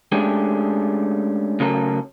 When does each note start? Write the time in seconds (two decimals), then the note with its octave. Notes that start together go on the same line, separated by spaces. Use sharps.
0.12 G#3 A3 C#4 D4 G4
1.60 C#3 F#3 A3 C#4 A4 A#4